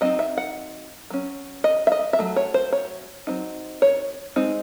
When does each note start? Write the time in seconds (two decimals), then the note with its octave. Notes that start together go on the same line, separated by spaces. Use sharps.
0.01 F#3 C4 D#4 D#5
0.19 E5
0.37 F#5
1.10 F#3 C#4
1.64 D#5
1.87 E5
1.92 D#5
2.13 E5
2.19 F#3 A3
2.36 C#5
2.54 C5
2.72 C#5
3.27 F#3 C4 D#4
3.82 C#5
4.36 G#3 C4 D#4